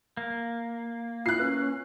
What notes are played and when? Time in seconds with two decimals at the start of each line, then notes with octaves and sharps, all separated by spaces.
0.17 A#3
1.26 E4 F4 F#6 C7
1.40 C#4 B4